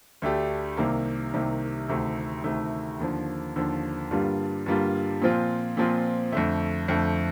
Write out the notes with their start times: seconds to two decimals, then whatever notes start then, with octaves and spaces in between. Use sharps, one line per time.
0.22 D2 D3 A3 D4 G4
0.77 C2 C3 D#3 A#3
1.33 C2 C3 D#3 A#3
1.89 D2 C3 D#3 A3
2.44 D2 C3 D#3 A3
3.00 D#2 D3 F3
3.56 D#2 D3 F3
4.11 G2 D3 G3 A#3 F4
4.66 G2 D3 G3 A#3 F4
5.22 A#2 F3 C4 F4
5.77 A#2 F3 C4 F4
6.32 F2 D3 A3
6.88 F2 D3 A3